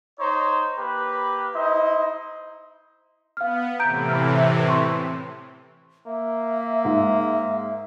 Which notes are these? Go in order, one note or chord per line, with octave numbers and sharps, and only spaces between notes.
D#4 C5 C#5
A#3 G4 B4
D#4 E4 C5 D#5
B3 F5 F6
A2 C3 E3 A#5 G6 D7
B5 F6
C6 C#6
A#3 E5
G#2